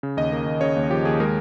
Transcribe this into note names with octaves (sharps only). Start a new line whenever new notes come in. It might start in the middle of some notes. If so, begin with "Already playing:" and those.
C#3
D#2 D#5
A#3
D#2
C#3 C#5
D#2
F3 G4
D#2 G#4
G#3 A#4